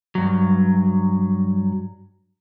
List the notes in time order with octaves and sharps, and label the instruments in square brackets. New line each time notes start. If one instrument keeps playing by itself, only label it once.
[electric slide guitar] G2 F#3